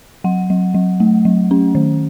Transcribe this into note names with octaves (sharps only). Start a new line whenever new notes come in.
F#3 F#5
F#3
F#3
A3
F#3
C#4
D#3